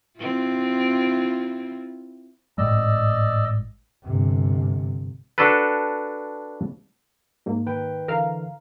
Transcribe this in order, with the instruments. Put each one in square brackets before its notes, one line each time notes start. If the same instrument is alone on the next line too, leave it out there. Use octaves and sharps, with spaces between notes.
[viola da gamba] C4 E4 F4
[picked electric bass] G#1 A2 G#3 [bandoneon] D5 D#5 E6
[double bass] G1 C3
[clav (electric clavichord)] D4 F#4 A4 B4
[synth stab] G#2 A#3
[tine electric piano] D#3 B4 G5
[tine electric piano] D3 E3 [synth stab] A#4 F5